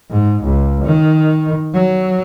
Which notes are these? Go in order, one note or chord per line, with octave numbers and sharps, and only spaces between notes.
G#2
C#2
D#3
F#3